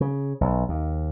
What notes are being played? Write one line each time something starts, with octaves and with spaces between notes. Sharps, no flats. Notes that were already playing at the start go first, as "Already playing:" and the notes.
C#3
B1
D#2